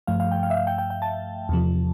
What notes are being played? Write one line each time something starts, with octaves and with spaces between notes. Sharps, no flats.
G2 F3 A3 F5
F5
G5
F5
E5
F5
G5
G5
G5
A5
E2 C3 F3